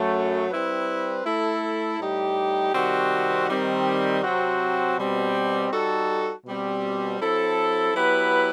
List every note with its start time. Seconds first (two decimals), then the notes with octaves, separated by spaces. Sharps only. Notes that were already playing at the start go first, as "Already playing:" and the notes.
Already playing: F#2 F#3 A3
0.50 G3 C4 E4 B4
1.25 A3 E4 A4
1.99 A2 G3 D#4 G4
2.74 C3 D#3 G3 C4 F#4
3.48 D#3 G3 C4
4.22 C3 F#3 C4 F#4
4.97 B2 G3 C4
5.71 G3 D#4 F#4 A4
6.45 B2 G3 C4
7.20 F#3 C4 E4 A4
7.94 F#3 B3 E4 G4 B4